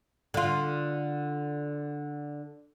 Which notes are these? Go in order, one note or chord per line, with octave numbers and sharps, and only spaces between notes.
D3 F4